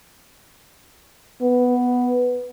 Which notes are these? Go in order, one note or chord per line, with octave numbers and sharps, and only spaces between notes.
B3